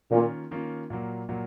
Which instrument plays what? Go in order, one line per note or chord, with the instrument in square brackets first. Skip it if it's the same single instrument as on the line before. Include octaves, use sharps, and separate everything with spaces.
[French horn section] A#2 [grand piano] D#3 A#3 C#4 F4
[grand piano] D#3 A#3 C#4 F4
A#2 F#3 A#3
A#2 F#3 A#3